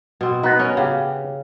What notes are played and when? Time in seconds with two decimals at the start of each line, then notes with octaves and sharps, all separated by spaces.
0.21 B2 C4
0.43 B3 D#4 B4
0.59 C#4 A#4
0.77 C#3 B3 G4